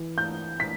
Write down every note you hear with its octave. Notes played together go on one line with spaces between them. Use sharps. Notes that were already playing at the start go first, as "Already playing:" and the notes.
Already playing: E3
G6
B6